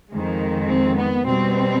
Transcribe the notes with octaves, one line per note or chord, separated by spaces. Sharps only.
F2 D#3 G#3
C4
B3
B2 G3 C4